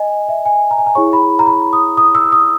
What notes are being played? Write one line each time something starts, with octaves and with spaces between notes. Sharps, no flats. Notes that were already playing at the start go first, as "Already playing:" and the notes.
Already playing: D#5 G#5
E5
G#5
A#5
G#5
A#5
E4 G#4 C#5 C#6
B5
A#5
B5
D#6
D#6
E6
D#6